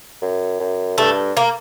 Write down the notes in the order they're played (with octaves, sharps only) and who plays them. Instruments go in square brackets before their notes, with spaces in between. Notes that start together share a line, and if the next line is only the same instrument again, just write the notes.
[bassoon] F#2
F#2
[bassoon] G2 [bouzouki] A3
[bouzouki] A#3